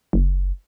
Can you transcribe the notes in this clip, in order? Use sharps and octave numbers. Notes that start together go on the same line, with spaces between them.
F#1